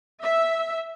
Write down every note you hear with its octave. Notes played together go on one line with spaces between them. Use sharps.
E5